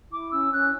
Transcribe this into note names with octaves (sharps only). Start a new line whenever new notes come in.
E4 D6
C#4 E6
C#4 F#6